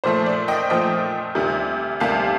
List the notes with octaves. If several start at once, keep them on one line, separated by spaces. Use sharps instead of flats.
A#2 F3 A3 C5
D5
D#5 G5
A#2 F3 A3 D#5 G5
D2 C3 G3
D2 C3 G3 F5 A5